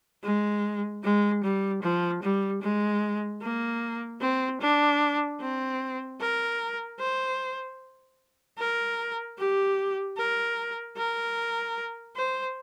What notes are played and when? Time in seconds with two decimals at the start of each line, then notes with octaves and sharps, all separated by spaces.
0.23 G#3
1.03 G#3
1.43 G3
1.83 F3
2.22 G3
2.62 G#3
3.42 A#3
4.21 C4
4.61 D4
5.40 C4
6.20 A#4
6.99 C5
8.58 A#4
9.38 G4
10.17 A#4
10.97 A#4
12.16 C5